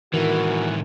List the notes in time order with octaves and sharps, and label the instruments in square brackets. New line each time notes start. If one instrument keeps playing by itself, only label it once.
[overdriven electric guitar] A2 D#3 [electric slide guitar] E3 [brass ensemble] F#4 A#4